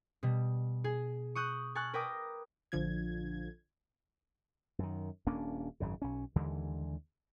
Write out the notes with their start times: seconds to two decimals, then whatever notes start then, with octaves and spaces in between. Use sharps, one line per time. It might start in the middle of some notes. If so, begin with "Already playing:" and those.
0.23 B2 G3
0.84 G#4
1.35 C#6 D#6 F#6 G6
1.75 G#5 A5 C#6 F6 F#6
1.94 A#4 B4 G5 A#5 D6 D#6
2.72 A#1 D3 F3 G#6
4.79 F#2 D#3
5.27 D#1 A#3 C#4 D4
5.80 G#1 F#2 C#3
6.02 B1 C#4
6.36 D#2 D3 E3 G#3